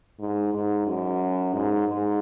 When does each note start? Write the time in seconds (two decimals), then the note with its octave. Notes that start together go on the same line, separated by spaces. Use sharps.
0.19 G#2
0.53 G#2
0.86 F#2
1.54 G#2
1.87 G#2